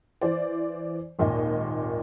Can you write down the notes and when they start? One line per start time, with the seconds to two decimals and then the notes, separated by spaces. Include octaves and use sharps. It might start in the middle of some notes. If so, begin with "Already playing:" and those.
0.21 E3 C5 D5
1.19 G#1 D#2 A#2 D#5